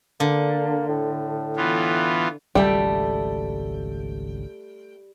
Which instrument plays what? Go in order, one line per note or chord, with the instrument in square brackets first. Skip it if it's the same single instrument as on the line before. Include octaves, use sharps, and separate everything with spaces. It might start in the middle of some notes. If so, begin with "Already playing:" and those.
[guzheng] D3 [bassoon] A#3
[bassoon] A2
[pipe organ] E3 B3 F4
[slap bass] G#1 C#2 F#3 [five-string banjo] G3 [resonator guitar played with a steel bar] A3 G5